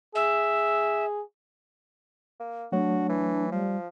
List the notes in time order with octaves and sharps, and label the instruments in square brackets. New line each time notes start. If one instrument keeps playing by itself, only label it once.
[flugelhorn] G#4 [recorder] E5
[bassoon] A#3
[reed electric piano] F#3 A3 C#5 [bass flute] D4 [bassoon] F#4
[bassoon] E3
[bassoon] F3 [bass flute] G3